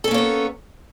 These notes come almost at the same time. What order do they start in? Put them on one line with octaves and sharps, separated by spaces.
A4 C#4 A#3 C#5 B3